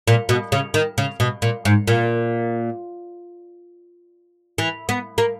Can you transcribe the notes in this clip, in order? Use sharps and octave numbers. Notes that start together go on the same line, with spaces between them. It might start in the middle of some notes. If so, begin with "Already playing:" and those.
A#2
B2
C#3
D#3
C#3
B2
A#2
G#2
A#2
E3
B3
A#3